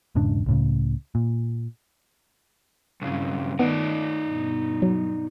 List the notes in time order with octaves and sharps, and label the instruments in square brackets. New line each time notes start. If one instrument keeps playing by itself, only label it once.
[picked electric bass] E1 G#2 C#3 D4
C#2 A2 C#3
A#2
[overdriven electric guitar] B1 C#3 [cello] G2
[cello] D#3 A3 [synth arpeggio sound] B3 [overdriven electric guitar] D#4 D5
[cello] G2 B2
[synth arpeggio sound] F#3